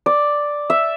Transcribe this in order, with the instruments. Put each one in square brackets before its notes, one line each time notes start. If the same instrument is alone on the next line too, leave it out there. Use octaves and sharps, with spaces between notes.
[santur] D5
E5